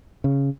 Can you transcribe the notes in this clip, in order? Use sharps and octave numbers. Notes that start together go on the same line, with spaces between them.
C#3